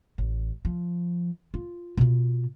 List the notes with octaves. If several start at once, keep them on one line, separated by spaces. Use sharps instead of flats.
A1
F3
F4
B2 F4